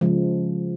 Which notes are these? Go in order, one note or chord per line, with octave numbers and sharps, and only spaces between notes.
C#3 F3 G#3